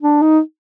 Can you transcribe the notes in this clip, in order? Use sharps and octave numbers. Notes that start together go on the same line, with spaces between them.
D4
D#4